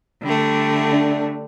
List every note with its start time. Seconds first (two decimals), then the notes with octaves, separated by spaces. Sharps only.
0.22 D3 G3 A3
0.92 D4